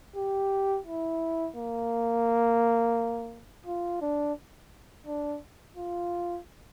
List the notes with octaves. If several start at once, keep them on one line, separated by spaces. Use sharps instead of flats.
G4
E4
A#3
F4
D4
D4
F4